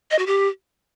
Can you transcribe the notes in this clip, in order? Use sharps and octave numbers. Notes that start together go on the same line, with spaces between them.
D#5
F#4
G4